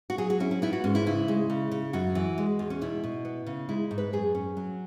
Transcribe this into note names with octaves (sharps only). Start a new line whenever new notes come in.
F#4
F#3 G#4
F#4
C#4 E4
C#4
B3 E4
F#4
G#2 C#4
E4
C#3 E4
G#3
C#3
C#3
F#2 F#4
E3
G#3
E2
C#4
B2 E4
B2
B3
C#3
G#3 E4
G#2
B4
F#2 G#4
C#4
F#3